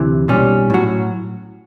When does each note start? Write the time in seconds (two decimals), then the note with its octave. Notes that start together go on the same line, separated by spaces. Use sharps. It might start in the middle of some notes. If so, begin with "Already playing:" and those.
Already playing: D2 C3 E3 C4
0.28 B1 A#2 G3 C#4
0.70 A2 F#3 F#4